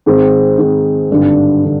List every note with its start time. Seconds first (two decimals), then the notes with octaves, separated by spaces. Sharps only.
0.06 G#2 D#3 G#3 C4
0.58 G#2 D#3 G#3 C4
1.10 G#1 G2 D3
1.65 D3